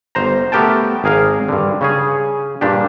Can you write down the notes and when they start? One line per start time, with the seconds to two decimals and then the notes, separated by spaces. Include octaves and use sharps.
0.15 G1 C5 A#5
0.52 A3 B3 G4 A#4 G5 A5
1.04 G#1 G#4 A#4 F5
1.49 G2 D3
1.81 C#3 C#4 G#4
2.61 G2 A#2 D4 G4